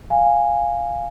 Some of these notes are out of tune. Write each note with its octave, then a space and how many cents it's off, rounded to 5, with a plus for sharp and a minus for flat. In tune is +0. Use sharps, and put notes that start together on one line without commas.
F5 +0 G#5 -10